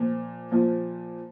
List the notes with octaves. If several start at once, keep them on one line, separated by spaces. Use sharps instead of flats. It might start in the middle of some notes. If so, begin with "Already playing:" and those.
Already playing: A#2 F3
A#2 F3